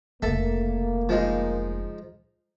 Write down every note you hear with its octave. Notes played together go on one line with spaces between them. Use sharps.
F1 C#3 A#3 A4 E5
F3 G#3 D#4